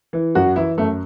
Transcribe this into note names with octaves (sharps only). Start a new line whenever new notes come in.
E3
F#2 F#4
E3 E4
F#2 A3